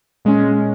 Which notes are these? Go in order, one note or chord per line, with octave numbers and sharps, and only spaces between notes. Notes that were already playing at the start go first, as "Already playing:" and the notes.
A#2 G#3 C#4